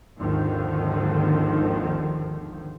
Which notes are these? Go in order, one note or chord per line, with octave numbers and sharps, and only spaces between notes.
G#1 D#2 G#2 D3 D#3 F3